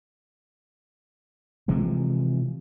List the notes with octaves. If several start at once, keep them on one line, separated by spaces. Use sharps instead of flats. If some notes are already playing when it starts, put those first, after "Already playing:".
C3 E3 F3 G#3